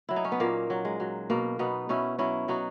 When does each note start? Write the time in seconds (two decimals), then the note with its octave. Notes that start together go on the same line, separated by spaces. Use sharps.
0.09 F#3 E4
0.16 D#4
0.25 C#4
0.32 B3
0.40 A#2 A#3
0.70 F#3
0.85 G#3
1.00 F#3
1.30 B2 A#3
1.59 B2 B3 D#4
1.89 B2 C#4 E4
2.19 F#3 C#4 E4
2.48 F#3 D#4 F#4